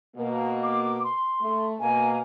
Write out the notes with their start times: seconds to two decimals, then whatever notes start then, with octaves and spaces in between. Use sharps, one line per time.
0.17 B2 A#3
0.63 D6
1.04 C6
1.41 A3
1.80 B2 A#3 G#5